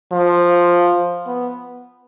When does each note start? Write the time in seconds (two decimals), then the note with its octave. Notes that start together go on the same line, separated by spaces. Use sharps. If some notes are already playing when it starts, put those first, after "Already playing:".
0.12 F3
1.27 B3